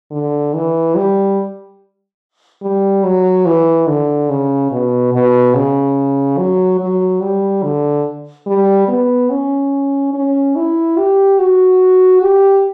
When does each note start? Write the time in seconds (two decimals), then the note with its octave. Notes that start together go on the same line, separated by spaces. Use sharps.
0.12 D3
0.54 E3
0.95 G3
2.62 G3
3.04 F#3
3.46 E3
3.87 D3
4.30 C#3
4.71 B2
5.13 B2
5.55 C#3
6.38 F#3
6.80 F#3
7.21 G3
7.63 D3
8.47 G3
8.88 B3
9.30 C#4
10.14 C#4
10.56 E4
10.97 G4
11.39 F#4
12.22 G4